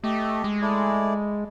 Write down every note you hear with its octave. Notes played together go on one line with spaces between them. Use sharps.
A3 G4 D#5
G#3
A3 E4 D5